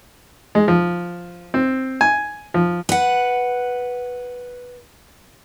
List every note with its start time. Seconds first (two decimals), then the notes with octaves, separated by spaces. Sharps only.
0.55 G#3
0.68 F3
1.54 C4
2.01 G#5
2.54 F3
2.89 B4 F#5